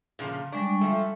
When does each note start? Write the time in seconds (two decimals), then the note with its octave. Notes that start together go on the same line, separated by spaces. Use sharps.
0.19 A#2 C#3 F3
0.52 G3 G#3 D4 C#6
0.81 F3 A3